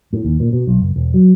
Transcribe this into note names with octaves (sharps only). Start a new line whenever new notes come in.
A2
D#2
A#2
B2
B1
F#1
E1
F#3